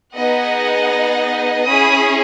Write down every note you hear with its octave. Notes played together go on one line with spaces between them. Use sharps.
B3 D#4 G#4 D#5 F#5
C#4 E4 G#4 B5 D#6